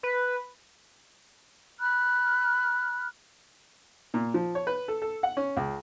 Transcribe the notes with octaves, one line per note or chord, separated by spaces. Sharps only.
B4
B5 F6 F#6
A#2
F3
C#5
B4
A4
A4
F#5
C#4
C#2